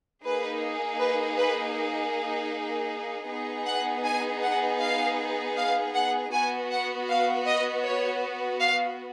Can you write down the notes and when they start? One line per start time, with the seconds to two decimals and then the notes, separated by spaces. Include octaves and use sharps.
0.24 A#3 D#4 G#4 B4
1.00 B4
1.38 B4
3.28 B3 D#4 G#4
3.66 F#5
4.04 G#5
4.42 F#5
4.80 F5
5.57 F5
5.95 F#5
6.32 B3 F#4 G#5
6.70 F#5
7.08 F5
7.46 D#5
7.84 C#5
8.60 F5